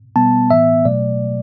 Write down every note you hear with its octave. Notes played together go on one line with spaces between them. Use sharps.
B2 G3 B3 A5
A2 E3 B3 E5
B2 F#3 A3 D5